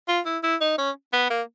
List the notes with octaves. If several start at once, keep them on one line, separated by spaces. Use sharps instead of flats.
F4
E4
E4
D#4
C#4
B3
A#3